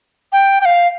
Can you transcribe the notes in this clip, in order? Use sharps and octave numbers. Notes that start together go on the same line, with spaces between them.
G5
G5
F5